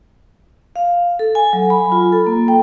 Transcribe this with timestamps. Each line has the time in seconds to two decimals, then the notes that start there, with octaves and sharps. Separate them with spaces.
0.76 F5
1.19 A4
1.35 G#5
1.53 F#3
1.70 B5
1.92 F4
2.13 A4
2.27 A#3
2.48 G5